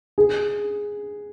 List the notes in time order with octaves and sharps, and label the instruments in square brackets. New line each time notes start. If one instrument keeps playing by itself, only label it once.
[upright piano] G#4